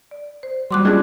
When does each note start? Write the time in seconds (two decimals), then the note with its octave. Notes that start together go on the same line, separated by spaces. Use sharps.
0.11 D5
0.43 C5
0.71 F#3 G3 C6 D6 F#6
0.85 G3 G#3 C#4 D4 F4 G#4